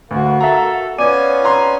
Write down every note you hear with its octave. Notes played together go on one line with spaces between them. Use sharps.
D2 A#3 F#4
A4 E5 A#5
B3 C#4 F4 D5 G#5 D6 D#7
A#5 C6